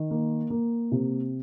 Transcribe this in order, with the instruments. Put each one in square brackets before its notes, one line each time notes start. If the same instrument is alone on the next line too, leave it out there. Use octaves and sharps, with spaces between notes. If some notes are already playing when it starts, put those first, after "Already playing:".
Already playing: [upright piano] D#3
A#3
A#3
C3